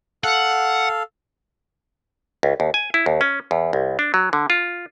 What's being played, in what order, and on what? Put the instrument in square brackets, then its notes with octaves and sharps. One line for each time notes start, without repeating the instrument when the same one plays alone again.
[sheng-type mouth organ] A4 F5 [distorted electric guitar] F#5
[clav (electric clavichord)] C#2
D#2
G#5
E4
D#2
C#4
E2
C2
D4
F#3
D3
F4